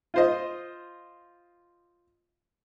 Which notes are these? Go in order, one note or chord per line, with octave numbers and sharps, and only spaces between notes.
F4 C5 D#5